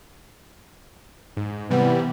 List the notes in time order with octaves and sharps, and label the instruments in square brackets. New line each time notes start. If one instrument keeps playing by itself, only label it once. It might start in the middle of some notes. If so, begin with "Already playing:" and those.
[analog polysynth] G#2
[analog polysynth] C3 E3 G3 [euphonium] B3